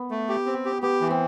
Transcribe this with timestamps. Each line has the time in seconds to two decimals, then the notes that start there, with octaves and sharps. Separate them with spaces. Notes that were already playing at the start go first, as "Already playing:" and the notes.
Already playing: B3
0.11 A3
0.29 G4
0.46 C4
0.65 G4
0.82 B3 G4
1.01 E3
1.10 C4